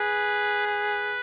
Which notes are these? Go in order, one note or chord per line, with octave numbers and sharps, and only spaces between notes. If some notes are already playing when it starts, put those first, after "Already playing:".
Already playing: G#4 B4
B4